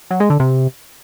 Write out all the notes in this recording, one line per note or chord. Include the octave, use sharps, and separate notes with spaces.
F#3
G#3
D3
C3